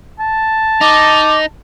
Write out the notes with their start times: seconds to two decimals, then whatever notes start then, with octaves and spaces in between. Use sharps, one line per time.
0.20 A5
0.81 D#4 D6